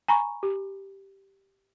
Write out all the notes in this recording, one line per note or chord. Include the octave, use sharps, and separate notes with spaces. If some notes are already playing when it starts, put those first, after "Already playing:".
G#5 A#5 B5 C#6
G4